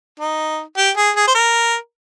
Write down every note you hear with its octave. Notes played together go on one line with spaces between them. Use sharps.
D#4
G4
G#4
G#4
C5
A#4